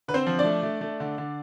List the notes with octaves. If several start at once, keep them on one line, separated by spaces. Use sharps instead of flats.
D3 B4
C4 C5
F3
D4 D5
A3
A3
A3
D3
D3